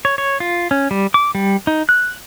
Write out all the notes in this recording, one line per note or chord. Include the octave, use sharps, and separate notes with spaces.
C#5
C#5
F4
C#4
G3
D6
G3
D#4
F#6